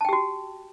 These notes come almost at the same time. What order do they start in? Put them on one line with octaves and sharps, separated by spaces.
A5 G5 G4 F#4